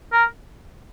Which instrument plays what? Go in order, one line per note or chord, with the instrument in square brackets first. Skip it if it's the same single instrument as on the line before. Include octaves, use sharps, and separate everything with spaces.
[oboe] A#4